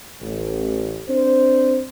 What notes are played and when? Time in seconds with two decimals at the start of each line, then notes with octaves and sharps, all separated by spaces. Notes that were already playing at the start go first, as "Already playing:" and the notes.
0.21 A1
1.08 C4 D4 C5